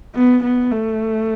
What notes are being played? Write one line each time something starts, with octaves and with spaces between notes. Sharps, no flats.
B3
B3
A3